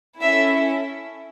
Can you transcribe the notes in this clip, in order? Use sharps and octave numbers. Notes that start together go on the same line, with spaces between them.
C#4 E4 A4 E5